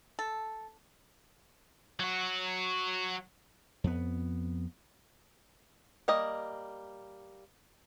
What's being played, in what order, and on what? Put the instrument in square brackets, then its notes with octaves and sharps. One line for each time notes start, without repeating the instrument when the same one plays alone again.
[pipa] A4
[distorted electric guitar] F#3 F#4
[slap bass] F2 B3
[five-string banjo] G3 A#3 D#5